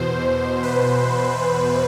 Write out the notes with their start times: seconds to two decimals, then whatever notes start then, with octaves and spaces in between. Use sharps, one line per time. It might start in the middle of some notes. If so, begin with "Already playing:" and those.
Already playing: E2 B2 C5
0.63 B4